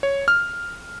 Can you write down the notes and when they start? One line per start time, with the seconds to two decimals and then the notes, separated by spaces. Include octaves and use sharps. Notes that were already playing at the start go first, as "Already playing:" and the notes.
0.03 C#5
0.28 F6